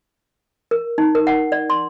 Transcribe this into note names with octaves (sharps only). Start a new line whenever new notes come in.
A#4
D#4
A#4
F#5
D5
C6